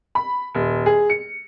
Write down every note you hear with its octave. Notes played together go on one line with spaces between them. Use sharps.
B5
D#1
G#4
C#7